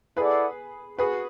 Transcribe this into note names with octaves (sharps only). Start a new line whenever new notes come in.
E4 G#4 A4 B4 D5 F#5
F#4 G#4 B4